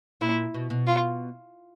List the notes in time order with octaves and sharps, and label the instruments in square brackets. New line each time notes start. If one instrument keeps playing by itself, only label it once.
[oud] A#2 [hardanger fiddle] E4
[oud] B2
B2
[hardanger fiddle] F4